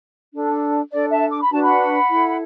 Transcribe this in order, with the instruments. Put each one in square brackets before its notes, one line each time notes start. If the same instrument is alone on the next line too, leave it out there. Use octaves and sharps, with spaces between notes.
[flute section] D4 A4
D4 A4 D5
E5 A5
D6
B5
D4 F#4 B4 A5
F#5 B5
E4 A4